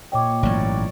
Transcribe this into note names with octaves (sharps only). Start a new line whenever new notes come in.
A#2 C#5 D#5 G5 D6
A1 G#2 F#3 C#5 D5